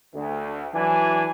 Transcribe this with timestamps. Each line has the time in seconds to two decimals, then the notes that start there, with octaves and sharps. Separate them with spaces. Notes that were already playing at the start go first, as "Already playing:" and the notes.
0.15 D2
0.75 E3 F#3 D4 D5 G#5